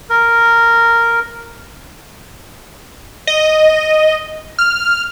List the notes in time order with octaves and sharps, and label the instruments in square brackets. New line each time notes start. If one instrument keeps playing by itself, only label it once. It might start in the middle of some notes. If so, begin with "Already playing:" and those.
[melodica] A#4
[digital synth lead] D#5
F6